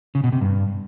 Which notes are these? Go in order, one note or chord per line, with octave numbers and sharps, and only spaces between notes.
C#3
B2
C3
G2